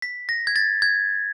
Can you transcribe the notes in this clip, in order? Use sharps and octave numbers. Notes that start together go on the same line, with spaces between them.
B6
A#6
G#6
A6
G#6